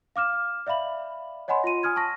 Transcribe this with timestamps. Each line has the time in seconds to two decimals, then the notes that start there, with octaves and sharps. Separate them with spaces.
0.16 F5 D6 F6 E7
0.67 D5 E5 F5 B5 F#7
1.48 C#5 D#5 F#5 G#5 B5 C6
1.64 F4 C6 D#7
1.83 G#5 D#6 F6 G#6
1.96 A5 C#6 A#6